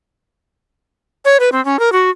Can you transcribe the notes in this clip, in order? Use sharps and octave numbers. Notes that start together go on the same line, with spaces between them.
C#5
B4
C4
C#4
A#4
F#4